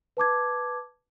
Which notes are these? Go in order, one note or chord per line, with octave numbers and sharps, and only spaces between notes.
B4 A5 D6 G#6